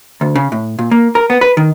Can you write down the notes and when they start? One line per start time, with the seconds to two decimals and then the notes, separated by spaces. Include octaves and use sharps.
0.21 D2
0.36 C#3
0.52 A2
0.79 A#2
0.91 A#3
1.15 A#4
1.30 B3
1.41 B4
1.57 D#3